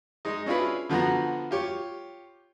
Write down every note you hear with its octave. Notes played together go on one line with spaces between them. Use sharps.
G#3 D#4
C#4 D4 E4 F4 G#4 B4
D3 F3 B3 F#4 A#5
F4 G4 C#5